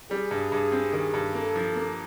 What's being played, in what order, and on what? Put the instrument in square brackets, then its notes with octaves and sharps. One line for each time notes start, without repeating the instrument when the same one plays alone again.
[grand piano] G3 [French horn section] G#4
[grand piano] G2
G2
C4
D#3
G2
[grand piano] A#3 [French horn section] A4
[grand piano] F3
A#3